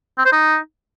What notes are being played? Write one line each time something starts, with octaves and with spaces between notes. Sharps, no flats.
C4
C5
D#4